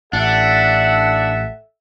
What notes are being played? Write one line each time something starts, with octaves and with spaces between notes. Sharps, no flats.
A1 D4 A4 E5 F#5